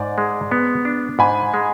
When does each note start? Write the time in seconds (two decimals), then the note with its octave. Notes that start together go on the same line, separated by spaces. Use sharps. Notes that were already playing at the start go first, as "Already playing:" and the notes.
Already playing: G#2 D5
0.18 G#3
0.51 B3
0.85 D4
1.19 G#2 G#5 B5
1.54 G#3